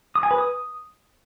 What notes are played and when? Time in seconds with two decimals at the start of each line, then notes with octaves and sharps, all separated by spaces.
0.15 D#6
0.23 G#5
0.31 B4
0.38 D#6